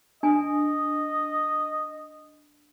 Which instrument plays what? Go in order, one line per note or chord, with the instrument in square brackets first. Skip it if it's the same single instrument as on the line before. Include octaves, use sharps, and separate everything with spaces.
[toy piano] D4 G#5 [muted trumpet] D#5